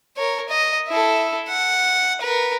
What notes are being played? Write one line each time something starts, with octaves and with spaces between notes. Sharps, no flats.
A#4 C#5
D#5
E4 A4
F#5
A#4 B4